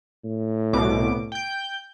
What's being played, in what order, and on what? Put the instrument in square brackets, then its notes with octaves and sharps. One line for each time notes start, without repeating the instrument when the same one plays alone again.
[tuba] A2
[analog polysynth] C2 B2 D6
G5 G6